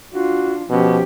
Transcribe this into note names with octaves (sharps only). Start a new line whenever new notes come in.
D4 F4 F#4
B2 F3 C#4 G4